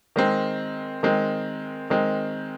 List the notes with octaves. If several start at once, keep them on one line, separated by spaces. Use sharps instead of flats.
D#3 G#3 C4
D#3 G#3 C4
D#3 G#3 C4